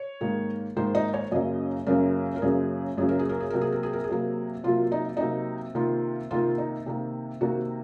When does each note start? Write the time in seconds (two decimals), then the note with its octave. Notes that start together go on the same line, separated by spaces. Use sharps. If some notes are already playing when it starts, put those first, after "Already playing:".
Already playing: C#5
0.21 G#2 D#3 A#3
0.77 G#2 D#3 A#3 C5
0.95 D#4
1.14 C#5
1.31 F#2 C#3 F#3 A#3 D#5
1.87 F#2 C#3 F#3 A#3 A#4
2.36 A#4
2.42 F#2 C#3 F#3 A#3 G#4
2.98 F#2 C#3 F#3 A#3 G#4
3.09 A#4
3.19 G#4
3.29 A#4
3.40 G#4
3.50 C3 F#3 A#3 A#4
3.61 G#4
3.72 A#4
3.83 G#4
3.93 A#4
4.04 G#4
4.09 C3 F#3 A#3
4.64 C3 F#3 A#3 F4
4.92 D#4
5.17 C3 F#3 A#3 D#4
5.75 C3 D#3 A#3 F4
6.31 C3 D#3 A#3 F4
6.58 D#4
6.86 C3 D#3 A#3
7.41 C3 D#3 A#3 F#4